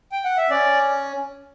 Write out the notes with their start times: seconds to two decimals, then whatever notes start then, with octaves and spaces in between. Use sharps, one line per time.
0.12 G5
0.24 F#5
0.37 E5
0.50 C#4 D5